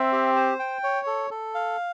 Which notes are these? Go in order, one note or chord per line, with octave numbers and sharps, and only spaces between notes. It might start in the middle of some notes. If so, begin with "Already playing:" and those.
Already playing: C4 E5
G4
C5
G5
C#5
A4
A4
F5